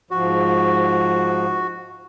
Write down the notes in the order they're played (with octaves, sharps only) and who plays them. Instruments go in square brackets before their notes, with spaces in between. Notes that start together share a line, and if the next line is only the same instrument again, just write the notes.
[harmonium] G#2 F3 [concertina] F#4